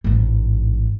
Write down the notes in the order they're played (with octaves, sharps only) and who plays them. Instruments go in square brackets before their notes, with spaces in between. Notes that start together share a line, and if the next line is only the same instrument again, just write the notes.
[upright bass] A1 G#2